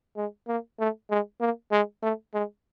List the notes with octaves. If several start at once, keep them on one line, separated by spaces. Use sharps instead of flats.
G#3
A#3
A3
G#3
A#3
G#3
A3
G#3